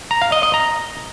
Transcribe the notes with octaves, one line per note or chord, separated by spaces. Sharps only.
A#5
F5
D#5
D#5
A#5